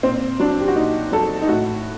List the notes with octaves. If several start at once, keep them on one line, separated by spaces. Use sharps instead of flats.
A#2 C4
F#3 D4
G4
F#4
A#2 D#4
F#3 A4
D#4
A2 F#4